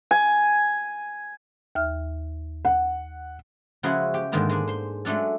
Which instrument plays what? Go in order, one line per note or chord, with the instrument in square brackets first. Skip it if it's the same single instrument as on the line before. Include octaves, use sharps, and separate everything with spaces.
[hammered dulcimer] G#5
[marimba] D#2 E5 F6
[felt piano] F#5
[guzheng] C#3 F3 G#3 E4 F#4 G#4
G4
G#2 D3 D#3 A#3 B3
G#3 D4
C5 C6
F#3 G#3 A3 D4 A4